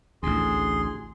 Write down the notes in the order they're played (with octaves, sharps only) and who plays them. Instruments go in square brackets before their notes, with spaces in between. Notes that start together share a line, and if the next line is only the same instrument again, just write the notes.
[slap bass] A1 D2 [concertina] G#4 C6